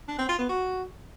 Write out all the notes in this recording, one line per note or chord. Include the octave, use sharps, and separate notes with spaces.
D4
C4
F4
B3
F#4